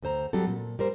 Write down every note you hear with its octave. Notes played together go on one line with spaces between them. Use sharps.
D2 A4 C5 A#5
F#3 G3 C4 A4
A#2
G3 A#4 C5